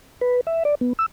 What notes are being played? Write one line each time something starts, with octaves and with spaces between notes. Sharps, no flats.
B4
E5
D5
B3
E6